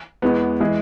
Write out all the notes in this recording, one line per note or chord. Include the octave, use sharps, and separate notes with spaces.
E2 E3 G#3 B3
E3 G#3 E4 G#4